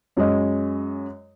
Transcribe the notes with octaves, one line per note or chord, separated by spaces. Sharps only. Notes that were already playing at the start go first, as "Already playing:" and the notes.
F#2 G#3 D#5